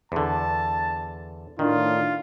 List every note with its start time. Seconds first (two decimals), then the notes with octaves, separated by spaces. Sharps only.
0.12 E2 D3 A5
1.59 A2 D#3 D4 F4